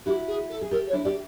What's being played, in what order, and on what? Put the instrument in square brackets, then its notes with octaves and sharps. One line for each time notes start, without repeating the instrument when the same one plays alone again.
[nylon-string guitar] E4 F#4 [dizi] G4
[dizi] G#4
A4
[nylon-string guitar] G#4
[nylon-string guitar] G4 A4 [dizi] A#4
[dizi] C#5
[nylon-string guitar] D4 E4
[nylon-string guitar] G4 [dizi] D5